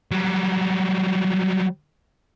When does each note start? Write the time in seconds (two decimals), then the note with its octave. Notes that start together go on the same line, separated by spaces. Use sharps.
0.11 F#3 G3